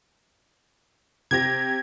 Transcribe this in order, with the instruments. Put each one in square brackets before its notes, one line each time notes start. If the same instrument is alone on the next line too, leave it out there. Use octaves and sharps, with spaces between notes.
[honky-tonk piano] C3 G4 A#6 [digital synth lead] G#6